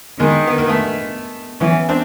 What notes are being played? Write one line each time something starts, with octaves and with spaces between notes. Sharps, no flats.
D#3 G#3 A#3
B3
A#3
A3 B3
E3 B3 C#4
C4 D4